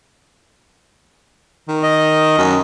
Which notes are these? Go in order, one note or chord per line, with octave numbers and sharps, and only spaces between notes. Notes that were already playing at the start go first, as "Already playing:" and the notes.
D#3
D#5
F#2